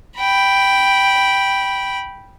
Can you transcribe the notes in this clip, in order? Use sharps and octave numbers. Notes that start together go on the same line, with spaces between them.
G5 B5